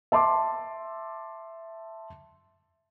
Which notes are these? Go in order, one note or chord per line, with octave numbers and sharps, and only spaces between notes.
E5 A5 C6 D6